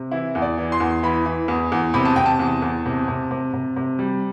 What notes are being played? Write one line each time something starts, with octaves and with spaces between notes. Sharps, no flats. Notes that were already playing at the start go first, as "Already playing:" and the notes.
Already playing: C3
E3 E4
E2
D5
E3
C6
E2
E3 B5
E3
E2
E2
C3 B5
A5
C3 G5
A5
E2
E2
C3
C3
C3
C3
C3
G3